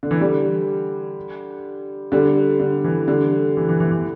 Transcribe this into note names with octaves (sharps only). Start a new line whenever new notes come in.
D3
E3
D3 G3
D3 G3
D3
E3
D3 G3
E3
E3
E3
E3